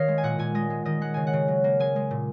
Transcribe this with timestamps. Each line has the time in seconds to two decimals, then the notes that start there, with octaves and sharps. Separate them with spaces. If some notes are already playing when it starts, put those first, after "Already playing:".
Already playing: D#3 C#5 D#5 F5
0.08 G#3
0.18 G#5
0.23 A#2 F#5
0.39 A#2 G#5
0.55 G#3 D#5
0.70 G#3
0.85 D#3 D#5
1.01 G#3 F#5
1.14 C#3 G#5
1.27 F#5
1.33 C#3
1.48 F#3
1.64 A#3
1.80 G#3 G#5
1.96 G#3
2.11 A#2